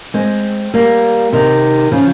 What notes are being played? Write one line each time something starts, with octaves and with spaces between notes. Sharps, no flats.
G#3 C4
G3 A#3
C3 D#3
C#3 F3